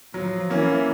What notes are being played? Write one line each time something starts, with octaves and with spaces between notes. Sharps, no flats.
F3 F#3
E3 A#3 C#4